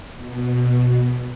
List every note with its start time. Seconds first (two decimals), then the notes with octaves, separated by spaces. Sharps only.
0.15 B2